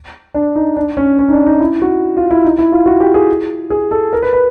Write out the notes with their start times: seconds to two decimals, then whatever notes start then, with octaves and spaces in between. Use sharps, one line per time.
0.34 D4
0.56 D#4
0.76 D4
0.97 C#4
1.19 C#4
1.28 D#4
1.33 D4
1.46 D#4
1.60 E4
1.82 F#4
2.17 F4
2.31 E4
2.45 D#4
2.59 E4
2.72 F4
2.86 F#4
3.00 G4
3.14 G#4
3.70 G#4
3.91 A4
4.13 A#4
4.22 B4
4.33 B4